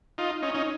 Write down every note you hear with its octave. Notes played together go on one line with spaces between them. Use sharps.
D#4 F4
C#4 D#4
C#4 D#4